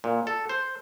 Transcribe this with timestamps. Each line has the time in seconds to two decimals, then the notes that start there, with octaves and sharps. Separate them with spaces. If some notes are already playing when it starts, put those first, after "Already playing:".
0.04 A#2
0.27 A4
0.49 C5